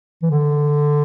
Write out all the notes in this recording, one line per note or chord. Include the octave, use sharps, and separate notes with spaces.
E3
D3